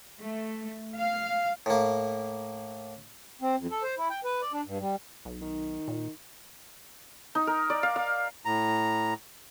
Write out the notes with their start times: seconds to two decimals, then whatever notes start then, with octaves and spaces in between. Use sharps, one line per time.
0.21 A3
0.97 F5
1.66 A2 A#3
3.41 C4
3.59 F2
3.71 A4
3.83 C5
3.98 E4
4.10 G5
4.24 B4
4.41 D5
4.53 D4
4.66 G2
4.80 G3
5.25 B1
5.41 D#3
5.88 A#2
7.35 D#4
7.47 A#4
7.70 D5
7.83 F5
7.96 F5
8.45 A2 A#5